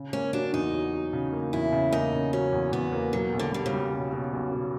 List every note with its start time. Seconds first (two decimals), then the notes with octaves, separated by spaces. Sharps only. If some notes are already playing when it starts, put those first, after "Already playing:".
Already playing: C#3
0.13 A#3 C#4
0.33 F#3 D4
0.53 E2 D#4
0.74 F#3
0.93 F#3
1.13 C#3
1.32 A#3
1.53 E2 E4
1.72 C#3
1.92 A#3 D#4
2.13 C#3
2.33 F#3 C#4
2.52 E2
2.72 E2 B3
2.93 A#3
3.13 B2 F#3
3.33 B1
3.39 D3
3.52 D3 G3
3.66 C#3
3.73 G3
3.93 B2
4.12 B2
4.33 B1
4.52 B2